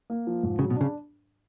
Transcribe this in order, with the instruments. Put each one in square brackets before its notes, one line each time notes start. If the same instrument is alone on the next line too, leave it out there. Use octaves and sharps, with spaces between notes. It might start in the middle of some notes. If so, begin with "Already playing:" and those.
[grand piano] A#3
F3
G#2
[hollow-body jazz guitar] C#3 [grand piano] F#3
[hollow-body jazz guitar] B2
[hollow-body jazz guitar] C#3 [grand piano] D4